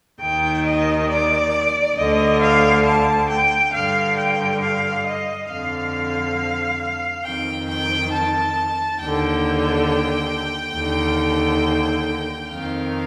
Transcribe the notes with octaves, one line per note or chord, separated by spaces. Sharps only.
D#2 D#3 G5
D#5
D5
D2 D3 D#5
F5
A5
G5
G2 D3 F5
G5
F5
D#5
F2 D3 F5
F2 D#3 G5
G5
A5
D#2 D3 G5
D#2 D3
F2 D#3 F5